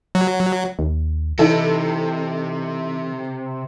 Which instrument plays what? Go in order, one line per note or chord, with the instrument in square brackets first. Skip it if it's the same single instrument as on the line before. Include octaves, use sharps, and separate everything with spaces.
[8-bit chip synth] F#3
[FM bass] D#2
[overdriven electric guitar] C3 [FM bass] E3 [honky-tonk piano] D#4 E4 A4